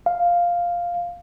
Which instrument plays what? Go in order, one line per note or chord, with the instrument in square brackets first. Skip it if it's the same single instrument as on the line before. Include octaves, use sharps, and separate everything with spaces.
[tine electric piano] F5